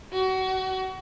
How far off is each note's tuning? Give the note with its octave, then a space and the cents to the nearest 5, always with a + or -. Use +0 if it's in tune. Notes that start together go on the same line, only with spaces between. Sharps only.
F#4 +30